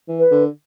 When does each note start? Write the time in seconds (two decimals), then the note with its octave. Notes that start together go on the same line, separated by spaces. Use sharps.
0.08 E3
0.19 B4
0.31 D3